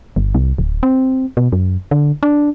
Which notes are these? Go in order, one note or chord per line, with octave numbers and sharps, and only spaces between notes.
G1
C2
D1
C4
B2
F#2
D3
D4